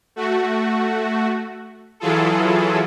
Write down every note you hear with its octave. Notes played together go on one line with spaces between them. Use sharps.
A3 F#4
E3 F#3 E4 F4 G#4 A4